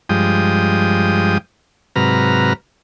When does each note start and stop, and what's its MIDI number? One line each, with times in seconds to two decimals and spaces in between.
0.09 1.38 43
0.09 1.38 53
0.09 1.38 56
0.09 1.38 79
0.09 1.38 87
1.96 2.53 44
1.96 2.53 48
1.96 2.53 54
1.96 2.53 71
1.96 2.53 82
1.96 2.53 89